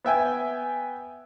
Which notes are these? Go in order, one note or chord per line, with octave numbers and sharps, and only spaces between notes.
B3 E5 G5 G#5